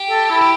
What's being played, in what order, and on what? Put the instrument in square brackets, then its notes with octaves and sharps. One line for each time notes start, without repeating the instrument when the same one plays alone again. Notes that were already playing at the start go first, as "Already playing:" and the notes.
Already playing: [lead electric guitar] G4
[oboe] A4
E4
[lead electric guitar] G4